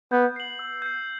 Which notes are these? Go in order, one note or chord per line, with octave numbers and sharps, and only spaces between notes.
B3 G6
C7 F#7
E6
G6 C7